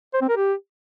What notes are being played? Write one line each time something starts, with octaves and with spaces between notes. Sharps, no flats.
C5
C4
A#4
G4